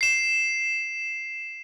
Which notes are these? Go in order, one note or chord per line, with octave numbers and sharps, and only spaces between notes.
C7 E7